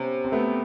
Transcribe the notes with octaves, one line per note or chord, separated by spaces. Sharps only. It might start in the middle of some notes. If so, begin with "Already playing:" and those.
Already playing: C3 B3 C#4
C4
A3 B3